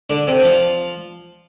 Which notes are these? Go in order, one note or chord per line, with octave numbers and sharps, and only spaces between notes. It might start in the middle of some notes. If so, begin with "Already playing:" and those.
D3 D4
C3 C4
D4
F3 F4